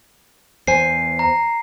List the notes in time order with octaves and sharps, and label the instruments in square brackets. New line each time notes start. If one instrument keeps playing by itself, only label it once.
[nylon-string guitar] E2 C5 G#5 [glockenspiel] C7
[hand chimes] A#5